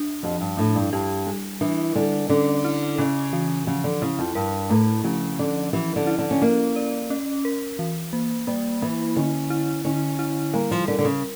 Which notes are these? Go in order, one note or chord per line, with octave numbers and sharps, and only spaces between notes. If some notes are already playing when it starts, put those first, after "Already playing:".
Already playing: D4
F2 F3
G2
A2 D4
G2
G2 G4
G3
E3 D4
D3 G3
D3 C#4
E4
C#3 C#4
E3
C#3 F3
D3
C#3 E4
F2
G2 A#4
A2 A3
C#3 F3
D3 C#4
E3 F3
D3
E4
D3
C#4
A#3 C#4
D5
C#4
A#4
E3
A#3
G3 A#3
E3 A#3
D3 C#4
E4
D3 C#4
E4
G3 A#3
F3
D3 A#4
D3
C#3